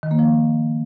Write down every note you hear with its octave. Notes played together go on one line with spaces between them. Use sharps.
D#3
A#3
F3